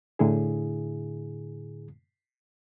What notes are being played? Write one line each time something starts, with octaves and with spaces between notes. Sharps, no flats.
A2 D3 E4 G#4